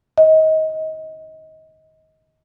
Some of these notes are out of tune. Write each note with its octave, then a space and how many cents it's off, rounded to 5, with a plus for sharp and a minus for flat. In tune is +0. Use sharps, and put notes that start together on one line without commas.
D#5 +25